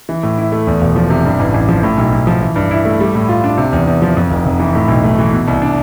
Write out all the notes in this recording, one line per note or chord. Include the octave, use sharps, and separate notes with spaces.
E3
A2
E4
A3
E2
E1
F3
C3
G2
A1
A1
F3
A2
B1
B1
F3
E3
G2
E4
A3
G3
A2
F4
D4
C3
E2
E2
F3
F2
F1
F1
E3
A2
B1
A3
E3
B2
C2
D4